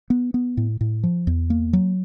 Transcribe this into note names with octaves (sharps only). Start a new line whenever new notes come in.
B3
B3
A2
A2
F3
E2
A#3
F#3